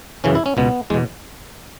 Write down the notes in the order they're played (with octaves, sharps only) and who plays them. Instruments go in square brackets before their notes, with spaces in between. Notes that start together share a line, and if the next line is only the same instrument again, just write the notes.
[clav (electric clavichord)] F#2 C#3 E3 C#4
E4
C#4
C#2 B2 B3
E2 B2 G#3